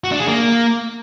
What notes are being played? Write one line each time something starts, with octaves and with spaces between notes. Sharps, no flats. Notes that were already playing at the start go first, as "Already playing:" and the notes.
F#4
D4
G#4
A#3